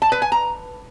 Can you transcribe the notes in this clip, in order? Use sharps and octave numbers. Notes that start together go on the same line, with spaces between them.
A5
B4
G#5
A#5